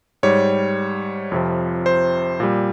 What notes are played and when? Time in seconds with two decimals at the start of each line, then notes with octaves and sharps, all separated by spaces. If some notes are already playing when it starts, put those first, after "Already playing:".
0.23 G#2 G3 C#5
1.32 F2 C3 F3
1.86 C5
2.40 A#2 G3